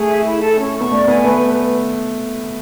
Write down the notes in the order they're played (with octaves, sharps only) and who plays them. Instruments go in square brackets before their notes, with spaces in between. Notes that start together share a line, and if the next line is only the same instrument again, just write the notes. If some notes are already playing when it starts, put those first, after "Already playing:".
Already playing: [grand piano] A3 [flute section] G#4
[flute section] E5
E4
A4
C#4
C#6
[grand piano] B3
[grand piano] A3 [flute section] D5
[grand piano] B3 [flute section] G#5
[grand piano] A3 [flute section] B4